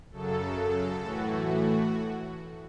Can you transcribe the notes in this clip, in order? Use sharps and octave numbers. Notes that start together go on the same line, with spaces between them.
F#2 C#3 F#3 A4
A2 E3 A3 F#4